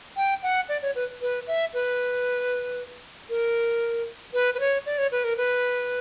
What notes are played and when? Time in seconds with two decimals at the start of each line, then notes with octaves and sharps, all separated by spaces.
0.16 G5
0.43 F#5
0.69 D5
0.82 C#5
0.95 B4
1.22 B4
1.47 E5
1.74 B4
3.29 A#4
4.33 B4
4.54 B4
4.60 C#5
4.86 D5
4.98 C#5
5.12 B4
5.24 A#4
5.37 B4